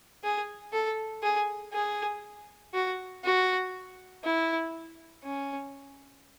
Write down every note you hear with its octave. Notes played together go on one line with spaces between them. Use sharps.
G#4
A4
G#4
G#4
F#4
F#4
E4
C#4